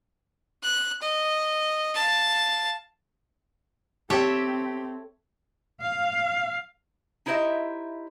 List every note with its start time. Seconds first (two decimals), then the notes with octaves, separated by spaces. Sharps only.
0.63 F#6
1.02 D#5
1.95 F5 A5
4.10 C4 G4 A4 C#5 E5 G5
5.80 F5
7.26 D#4 E4 G4 C5 D#5 E5